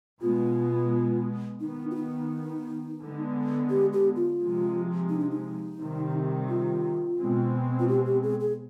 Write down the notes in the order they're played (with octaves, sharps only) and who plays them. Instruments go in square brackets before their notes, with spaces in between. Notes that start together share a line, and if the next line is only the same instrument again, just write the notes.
[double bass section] B2 G#3 B3 [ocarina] F4
[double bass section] D#3 B3 [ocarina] D#4
[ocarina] F4
D#4
[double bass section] D3 G#3 B3
[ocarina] G4
G4
F4
[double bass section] C3 F3 G#3
[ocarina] D#4
D4
D#4
[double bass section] C3 D#3 G3 C4
[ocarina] F4
[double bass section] B2 G#3 C4
[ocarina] F4
G4
G4
G#4
G#4